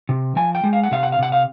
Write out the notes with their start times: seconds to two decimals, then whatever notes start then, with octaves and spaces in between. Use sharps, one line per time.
0.09 C3
0.36 F3 G#5
0.55 G5
0.64 G#3
0.73 F5
0.83 F#5
0.91 C3 F5
1.03 F#5
1.12 F5
1.19 C3 F#5
1.32 F5